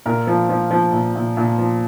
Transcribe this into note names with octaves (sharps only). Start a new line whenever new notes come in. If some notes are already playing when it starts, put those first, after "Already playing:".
A#2 A#4
F3
F3
F3
A#2
A#2
A#2
F3